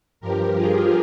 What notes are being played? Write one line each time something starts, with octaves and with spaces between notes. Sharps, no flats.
G2 F3 G4 A#4
F4 G#4